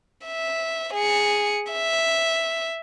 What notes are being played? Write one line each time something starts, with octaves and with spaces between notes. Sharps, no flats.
E5
G#4 C#7
E5